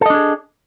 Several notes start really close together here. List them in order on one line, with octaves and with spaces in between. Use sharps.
A4 D#5 D4 G#4